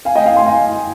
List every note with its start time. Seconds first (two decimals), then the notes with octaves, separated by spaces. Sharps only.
0.05 F5 G#5
0.16 D#5 G5
0.26 F5 G#5
0.36 G#5 C6
0.46 F5 G#5